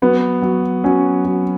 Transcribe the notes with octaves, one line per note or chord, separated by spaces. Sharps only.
F#3 B3
F#3
F#3 C#4
F#3